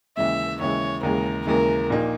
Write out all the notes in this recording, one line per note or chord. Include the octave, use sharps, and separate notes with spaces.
D#2 C#3 E3 G#3 E5
D#2 C#3 E3 G#3 C#5
D#2 C#3 E3 G#3 A#4
D#2 C#3 E3 G#3 A#4
A#1 A#2 A#3 D#4